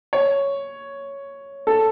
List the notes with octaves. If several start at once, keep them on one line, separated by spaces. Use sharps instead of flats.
C#5
A4